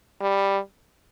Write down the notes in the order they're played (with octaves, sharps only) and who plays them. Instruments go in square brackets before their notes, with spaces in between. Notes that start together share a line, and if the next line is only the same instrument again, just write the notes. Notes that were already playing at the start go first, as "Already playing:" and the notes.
[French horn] G3